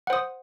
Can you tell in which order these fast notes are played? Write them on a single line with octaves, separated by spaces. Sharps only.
F#5 C5 D#6